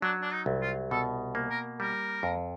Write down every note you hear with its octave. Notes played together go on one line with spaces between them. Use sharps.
F#3 D4
D4
D#4
C2
F4
B2 A4
A#3
A#4
G3 A#4
F2